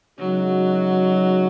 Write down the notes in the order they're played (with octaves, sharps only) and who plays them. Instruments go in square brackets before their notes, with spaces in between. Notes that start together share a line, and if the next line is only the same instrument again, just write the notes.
[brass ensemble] C#3 E3 G#3 D#4 F#4 [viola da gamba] F#3